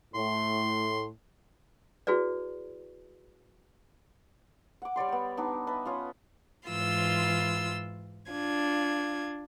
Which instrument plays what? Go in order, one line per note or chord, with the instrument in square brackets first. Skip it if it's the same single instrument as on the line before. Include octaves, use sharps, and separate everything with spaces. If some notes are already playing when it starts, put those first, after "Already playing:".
[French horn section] A2 [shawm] C6
[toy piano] E4 F#4 G#4 B4 D5
[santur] F#5 D6
G3 C#5 D5 C6
B3 G5
B3 D4 D#4
B4 D#5 E5 A5
C#4 F4 D#6
[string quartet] G#2 E3 F4 C6 E6
D4 F4 G#6